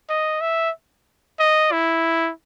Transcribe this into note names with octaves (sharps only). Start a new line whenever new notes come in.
D#5
E5
D#5
E4